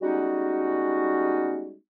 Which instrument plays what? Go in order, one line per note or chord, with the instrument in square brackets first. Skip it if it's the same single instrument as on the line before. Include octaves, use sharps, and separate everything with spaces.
[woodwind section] G3 G#3 B3 C#4 D#4 F#4